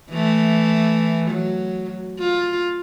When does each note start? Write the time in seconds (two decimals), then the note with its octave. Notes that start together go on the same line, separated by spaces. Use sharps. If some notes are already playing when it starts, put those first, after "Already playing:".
0.11 E3 A3
1.30 F#3
2.19 F4